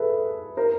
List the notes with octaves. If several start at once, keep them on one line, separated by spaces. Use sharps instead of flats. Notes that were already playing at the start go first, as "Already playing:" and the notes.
Already playing: G#4 A4 B4 E5
A#4 C5